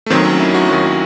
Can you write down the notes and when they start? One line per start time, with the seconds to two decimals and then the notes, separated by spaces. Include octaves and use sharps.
0.06 A3
0.10 D#2 D#3 F#3 C4
0.25 C#4
0.40 E4
0.54 F#4
0.69 D#2 D#3 F#3